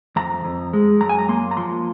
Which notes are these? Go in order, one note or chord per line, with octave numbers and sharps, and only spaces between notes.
F2 A#5
F2
G#3
F#2 A#5
G#5
A#5
A#3 C6
A#5
F3 C6